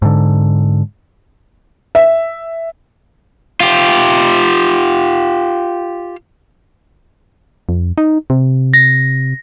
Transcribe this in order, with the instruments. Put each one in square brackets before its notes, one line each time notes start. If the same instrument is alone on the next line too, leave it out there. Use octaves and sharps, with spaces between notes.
[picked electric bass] G#2 D3
[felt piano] E5
[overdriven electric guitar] F4 G4
[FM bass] F2
D#4
C3
[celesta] A#6